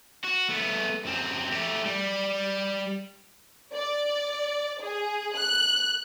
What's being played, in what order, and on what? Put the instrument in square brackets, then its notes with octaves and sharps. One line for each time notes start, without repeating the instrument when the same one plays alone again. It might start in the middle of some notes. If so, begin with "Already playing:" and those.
[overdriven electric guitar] F#4
A3 B3
F#2 C4
A3 G4
G3
[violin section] D5
G#4
F#6